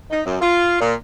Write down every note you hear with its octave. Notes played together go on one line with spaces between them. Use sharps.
D#4
F#2
F4
A#2